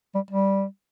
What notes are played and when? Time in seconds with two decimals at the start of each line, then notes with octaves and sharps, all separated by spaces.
0.15 G3
0.31 G3